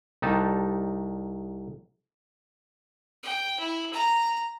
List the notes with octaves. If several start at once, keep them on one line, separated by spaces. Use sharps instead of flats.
C2 A3 D#4 G4 A5
G5
E4
A#5